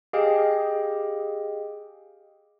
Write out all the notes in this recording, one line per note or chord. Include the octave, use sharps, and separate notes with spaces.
G4 G#4 D#5 F5 G5